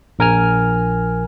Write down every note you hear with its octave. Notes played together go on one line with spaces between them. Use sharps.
A#1 A#4 G#5 F6